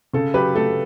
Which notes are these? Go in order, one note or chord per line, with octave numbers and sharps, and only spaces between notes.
C#3 A4
F#3 G4 B4
A3 A4